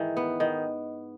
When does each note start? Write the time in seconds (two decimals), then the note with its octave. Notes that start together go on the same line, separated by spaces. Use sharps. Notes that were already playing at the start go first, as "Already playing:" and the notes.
Already playing: G#2 D#3 E3
0.17 B3
0.40 D#3